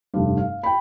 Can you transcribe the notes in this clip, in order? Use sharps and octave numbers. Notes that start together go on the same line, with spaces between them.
F1 G2
F5
G5 B5